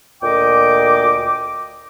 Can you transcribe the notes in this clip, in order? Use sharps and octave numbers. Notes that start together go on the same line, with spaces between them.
D2 A#2 D#5 G5 D6